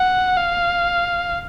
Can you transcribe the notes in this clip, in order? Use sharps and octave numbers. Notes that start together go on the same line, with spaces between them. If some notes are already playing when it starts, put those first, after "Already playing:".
Already playing: F#5
F5